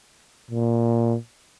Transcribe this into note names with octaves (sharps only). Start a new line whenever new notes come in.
A#2